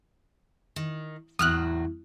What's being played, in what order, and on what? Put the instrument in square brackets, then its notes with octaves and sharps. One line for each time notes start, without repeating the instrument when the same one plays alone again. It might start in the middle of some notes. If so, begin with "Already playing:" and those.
[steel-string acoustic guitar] D#3
[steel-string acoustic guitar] E2 A2 F#3 [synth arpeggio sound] D#6 F6 F#6